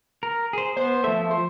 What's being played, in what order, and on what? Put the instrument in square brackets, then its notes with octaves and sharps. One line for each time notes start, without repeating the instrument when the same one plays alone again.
[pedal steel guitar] A#4
G#4 C5
[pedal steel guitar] B3 [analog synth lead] C5
[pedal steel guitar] F3 E5 [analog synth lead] A3
[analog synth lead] C5